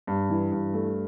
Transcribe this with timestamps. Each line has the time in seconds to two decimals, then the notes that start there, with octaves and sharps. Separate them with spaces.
0.07 G2
0.30 E3
0.52 G2
0.74 A3